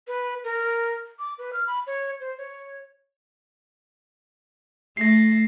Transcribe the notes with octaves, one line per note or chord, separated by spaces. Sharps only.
B4
A#4
D6
B4
F6
B5
C#5
C5
C#5
A3 A#6 C7